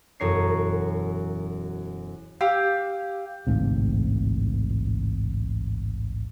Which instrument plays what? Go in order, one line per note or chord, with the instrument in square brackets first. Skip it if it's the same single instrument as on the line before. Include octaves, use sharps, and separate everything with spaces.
[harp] E1 F#2 A4 C#5 A#5 C7
[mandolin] G4 F5 D6 E6
[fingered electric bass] A1 D2 G#2 C3